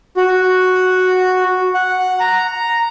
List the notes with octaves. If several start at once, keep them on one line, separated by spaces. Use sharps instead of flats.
F#4
F#5
A#5
A#5